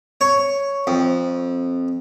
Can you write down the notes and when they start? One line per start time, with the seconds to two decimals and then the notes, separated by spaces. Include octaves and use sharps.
0.21 C#5
0.87 F2